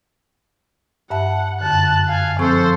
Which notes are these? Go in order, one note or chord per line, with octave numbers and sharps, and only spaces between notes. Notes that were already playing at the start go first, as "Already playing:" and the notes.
G2 E5 F#5 A5
F#2 D3 A5 F#6
F5 G#5
F3 C4 A4 C5 C#6